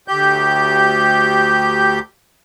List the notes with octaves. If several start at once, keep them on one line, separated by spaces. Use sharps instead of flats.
D2 G4 G6